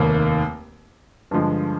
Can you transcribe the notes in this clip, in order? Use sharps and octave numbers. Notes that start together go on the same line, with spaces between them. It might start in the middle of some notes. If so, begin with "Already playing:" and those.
Already playing: F1 D#2 D#3 A#3
G2 D3 F3 G#3